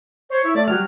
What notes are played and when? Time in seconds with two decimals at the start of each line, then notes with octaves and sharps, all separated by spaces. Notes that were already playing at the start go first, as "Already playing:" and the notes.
0.30 C5 C#5
0.44 E4
0.55 A3 D5
0.68 F#3 G3 F#4 F6